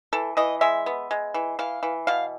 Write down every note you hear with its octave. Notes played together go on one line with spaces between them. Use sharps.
E3 A4
E3 D#5
G#3 E5
B3
G#3
E3
E3 F5
E3
B2 F5